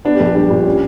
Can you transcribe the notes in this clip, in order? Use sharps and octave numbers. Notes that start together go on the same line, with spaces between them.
B3 D4
G4
A#1
G4
G3 D4
A#2
C#4